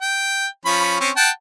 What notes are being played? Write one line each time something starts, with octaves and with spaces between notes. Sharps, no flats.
G5
F3 C#4 B5
C4 C#4
F#5 G5 A5